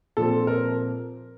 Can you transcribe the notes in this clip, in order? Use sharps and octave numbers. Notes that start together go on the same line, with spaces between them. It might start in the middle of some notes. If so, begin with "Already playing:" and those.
A#2 F3 C4 A4
A#4